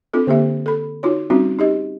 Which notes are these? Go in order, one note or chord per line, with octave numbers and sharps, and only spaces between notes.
C4 D4 F4 A4
D3 A#3 G4 E5
A4 B5
D#4 F4 F#4 C#5
G3 C4 C#4 D#4 F4 F#4
D#4 G4 D#5